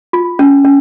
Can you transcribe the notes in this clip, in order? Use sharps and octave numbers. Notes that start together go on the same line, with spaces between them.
F4
C#4
C#4